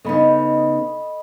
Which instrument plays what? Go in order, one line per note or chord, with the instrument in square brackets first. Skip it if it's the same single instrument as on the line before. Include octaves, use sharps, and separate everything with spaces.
[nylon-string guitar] C#3 B3 D#4 [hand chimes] A4 D#5 B5